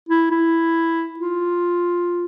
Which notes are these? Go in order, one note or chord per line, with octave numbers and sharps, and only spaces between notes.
E4
E4
F4